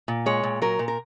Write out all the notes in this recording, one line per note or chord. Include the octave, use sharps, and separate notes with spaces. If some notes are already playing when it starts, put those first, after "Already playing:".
A#2
G#3 C#5
A#2
F#3 A#4
A#2
A#4